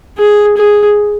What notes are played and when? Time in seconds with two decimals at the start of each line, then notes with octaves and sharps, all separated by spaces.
0.18 G#4
0.57 G#4